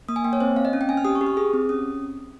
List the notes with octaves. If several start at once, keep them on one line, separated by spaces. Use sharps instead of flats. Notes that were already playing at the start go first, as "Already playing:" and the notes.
A#3 D#6
G#5
A#3 G5
C#5
C4 C5
C4 F5
D#5
C#4
G5
C#4 G#5
F6
G4 D#6
C#6
G4
F6
G#4 D#6
C4
C#4 D#6